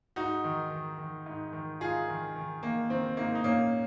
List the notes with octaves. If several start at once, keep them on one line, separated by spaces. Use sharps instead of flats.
G#2 D#4 F#4
D#3
D#3
D#3
G#2
D#3
G#2 F4 G#4
D#3
D#3
D#3 A#3
D#3 C4
G#2 A#3
D#4
A#2 A#3 C#4